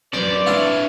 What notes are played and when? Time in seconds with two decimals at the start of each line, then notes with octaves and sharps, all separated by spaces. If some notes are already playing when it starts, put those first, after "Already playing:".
0.13 A#1 F#2 C#4 B4 C5 D5
0.46 D4 E4 F4 C#5 A5